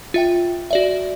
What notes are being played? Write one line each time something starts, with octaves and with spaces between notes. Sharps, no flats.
F4 E5 G5
F#4 D5 E5